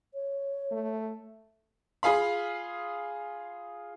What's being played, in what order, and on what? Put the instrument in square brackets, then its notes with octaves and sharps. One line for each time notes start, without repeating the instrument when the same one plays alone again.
[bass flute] C#5
[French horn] A3
[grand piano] F4 G#4 F5 B5